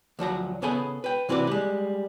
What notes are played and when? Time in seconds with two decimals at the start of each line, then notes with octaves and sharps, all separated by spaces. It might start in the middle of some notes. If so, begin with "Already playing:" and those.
0.19 D2 F3 F#3 A#5
0.62 C#3 B3 G#4 A4 G#5 B5
1.04 B4 G5
1.29 C3 E3 C4 F#4 B4 D5
1.47 G3 G#3